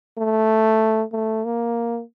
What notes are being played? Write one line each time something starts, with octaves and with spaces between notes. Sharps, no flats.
A3
A3
A#3